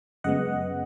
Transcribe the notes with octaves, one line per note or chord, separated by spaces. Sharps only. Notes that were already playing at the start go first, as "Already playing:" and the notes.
F#2 C#3 G#3 B3 D#5 F#5